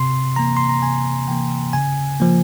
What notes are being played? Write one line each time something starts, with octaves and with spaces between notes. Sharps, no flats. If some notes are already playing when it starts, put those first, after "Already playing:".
Already playing: C3 C6
E3 A#3 A#5
C6
A#5
C3 G#5
E3 A#3 G5
C#3 G#5
F3 A#3